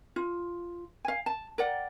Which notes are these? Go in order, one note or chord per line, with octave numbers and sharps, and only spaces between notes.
F4
F5 G#5
A5
A#4 D5 F#5 G5